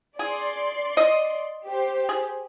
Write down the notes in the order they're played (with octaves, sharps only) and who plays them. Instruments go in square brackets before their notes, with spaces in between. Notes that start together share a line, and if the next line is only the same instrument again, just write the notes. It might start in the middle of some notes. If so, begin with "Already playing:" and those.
[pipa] G#4 [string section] D5 C6
[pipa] D#5
[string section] G4 C5
[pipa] G#4